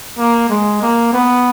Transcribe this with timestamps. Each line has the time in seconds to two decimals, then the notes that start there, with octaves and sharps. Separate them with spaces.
0.18 A#3
0.50 G#3
0.82 A#3
1.13 B3